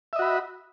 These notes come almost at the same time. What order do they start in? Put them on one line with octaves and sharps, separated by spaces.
E5 D#5 F#4 B5